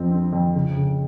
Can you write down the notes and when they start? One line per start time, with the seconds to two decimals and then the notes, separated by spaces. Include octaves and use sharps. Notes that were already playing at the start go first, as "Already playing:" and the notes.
Already playing: F2 F3 C4
0.10 C4
0.33 F2
0.55 C#3
0.77 C#3